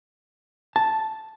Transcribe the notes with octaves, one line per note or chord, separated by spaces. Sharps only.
A5